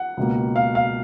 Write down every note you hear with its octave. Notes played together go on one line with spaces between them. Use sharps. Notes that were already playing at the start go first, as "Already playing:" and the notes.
Already playing: F#5
C#2 B2 A#3
F5
F5